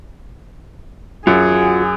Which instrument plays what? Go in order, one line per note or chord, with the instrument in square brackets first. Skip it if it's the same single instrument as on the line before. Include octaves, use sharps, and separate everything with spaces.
[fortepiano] F#2 [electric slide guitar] F4 F#4 [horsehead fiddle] G#4